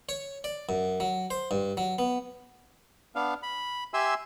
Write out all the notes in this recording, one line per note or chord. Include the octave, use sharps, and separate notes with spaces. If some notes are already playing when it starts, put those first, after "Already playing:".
C#5
D5
F#2
F#3
C5
G2
F#3
B3
B3 D4 F5
B5
G4 E5 G#5 C6 E6